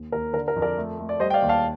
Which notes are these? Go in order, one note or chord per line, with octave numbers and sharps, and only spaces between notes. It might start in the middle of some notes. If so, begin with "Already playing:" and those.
Already playing: D#2
D#2 A#4
D3 A#4
A#4
F2
A#4 D5
A3
A3
D5
G3 C5 D#5
G5
D5 F5
D#2
F5 A5